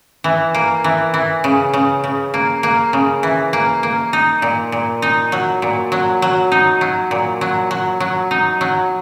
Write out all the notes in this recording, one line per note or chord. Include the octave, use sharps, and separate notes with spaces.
E3
A#3
E3
E3
C#3
C#3
C#3
A#3
A#3
C#3
E3
A#3
A#3
D#4
A#2
A#2
D#4
F#3
A#2
F#3
F#3
D#4
F#3
A#2
F#3
F#3
F#3
D#4
F#3